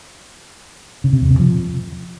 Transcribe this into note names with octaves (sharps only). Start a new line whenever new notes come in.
C#3
C3
E2
C3
F3